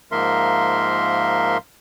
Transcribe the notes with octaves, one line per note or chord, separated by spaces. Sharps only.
G#2 F3 A#3 A#4 E5 C6